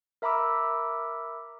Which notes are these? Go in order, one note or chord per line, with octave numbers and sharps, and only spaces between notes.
A#4 E5 A#5 B5 D6 E6